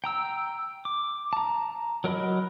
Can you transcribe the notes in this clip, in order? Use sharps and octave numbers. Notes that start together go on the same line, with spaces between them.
G5 A#5 E6
D6
A5 A#5
F#3 A#4 D#5 B5